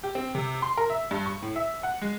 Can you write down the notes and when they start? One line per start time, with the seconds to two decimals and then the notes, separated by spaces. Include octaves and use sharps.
0.03 G4
0.15 C4
0.35 C3
0.62 C6
0.78 A#4
0.90 E5
1.11 G2
1.26 C#6
1.42 A2
1.56 E5
1.83 F#5
2.02 G#3